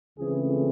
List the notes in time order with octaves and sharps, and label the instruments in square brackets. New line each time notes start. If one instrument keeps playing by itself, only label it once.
[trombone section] C#2 C#3 E3 A3 C4 G#4